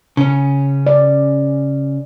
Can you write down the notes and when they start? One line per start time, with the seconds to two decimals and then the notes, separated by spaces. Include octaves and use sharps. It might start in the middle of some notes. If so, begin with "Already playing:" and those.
0.17 C#3 C#4
0.86 D5